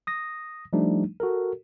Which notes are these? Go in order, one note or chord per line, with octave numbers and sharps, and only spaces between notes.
D#6 A#6
F3 G3 A3 D4 D#4
F#4 A4 A#4